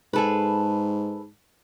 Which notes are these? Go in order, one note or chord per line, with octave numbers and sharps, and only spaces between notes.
G#2 G#4 A4 B4